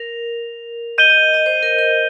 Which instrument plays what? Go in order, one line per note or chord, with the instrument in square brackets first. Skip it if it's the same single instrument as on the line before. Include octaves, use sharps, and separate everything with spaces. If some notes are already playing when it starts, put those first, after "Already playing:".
Already playing: [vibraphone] A#4 [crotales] F7
[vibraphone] D#5 [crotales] G6 D#7 G7
[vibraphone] D#5
D#5
C5
A#4
A#4